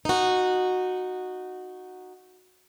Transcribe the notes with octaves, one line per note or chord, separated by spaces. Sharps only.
D#4 F#4